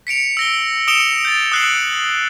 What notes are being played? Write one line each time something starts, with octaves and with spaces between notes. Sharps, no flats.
B6 C#7 D7 F7
E6 A#6 G7
D#6 C#7 D7 E7 F7 G7
G6 A6
D#6 E6 F#6 C7 E7 F#7